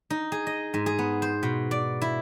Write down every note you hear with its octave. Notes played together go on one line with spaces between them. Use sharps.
D#4
G#4
D#5
G#2
G#4
B3
C5
B2
D5
E4